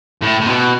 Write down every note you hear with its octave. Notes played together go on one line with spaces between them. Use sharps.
A2
A2
B2